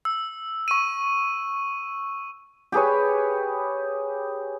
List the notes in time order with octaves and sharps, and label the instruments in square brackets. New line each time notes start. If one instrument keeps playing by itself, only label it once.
[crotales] E6
C#6 D#7
[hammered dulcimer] G4 G#4 B4 C#5